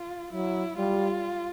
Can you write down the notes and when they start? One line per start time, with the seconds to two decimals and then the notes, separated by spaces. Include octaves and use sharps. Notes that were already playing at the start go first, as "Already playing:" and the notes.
Already playing: F4
0.33 F#3 E4
0.77 G3 F4